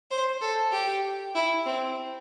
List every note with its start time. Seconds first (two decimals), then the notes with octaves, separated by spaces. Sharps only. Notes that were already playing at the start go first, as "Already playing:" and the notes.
0.11 C5
0.41 A4
0.72 G4
1.35 E4
1.66 C4